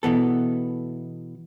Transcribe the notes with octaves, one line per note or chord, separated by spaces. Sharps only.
B2 E3 B3 A4